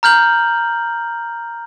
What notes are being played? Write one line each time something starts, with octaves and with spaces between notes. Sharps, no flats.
A#5 F6 G6 F#7